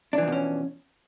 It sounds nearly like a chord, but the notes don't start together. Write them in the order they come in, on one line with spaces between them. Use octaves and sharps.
D4 E3 F3 B2 C#4